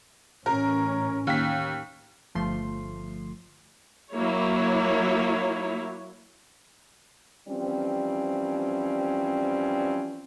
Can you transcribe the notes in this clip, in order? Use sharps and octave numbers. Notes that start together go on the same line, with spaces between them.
A1 C#4 A#4
D#2 B6
G1 F3 A3 C6
F#3 A#3 E4 C#5
E3 F3 G3 C4 C#4